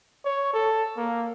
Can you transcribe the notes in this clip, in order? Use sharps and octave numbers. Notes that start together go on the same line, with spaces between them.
C#5
A4
A#3